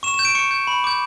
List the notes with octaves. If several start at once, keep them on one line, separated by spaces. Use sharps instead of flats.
C#6 E7
E7
G6
D7
C#6 C#7
G6
B5
D6 G6